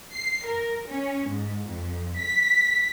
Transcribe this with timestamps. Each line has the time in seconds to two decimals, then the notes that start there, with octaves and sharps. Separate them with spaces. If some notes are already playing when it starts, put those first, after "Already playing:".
0.13 C7
0.46 A#4
0.87 C#4
1.29 G#2
1.67 F2
2.19 B6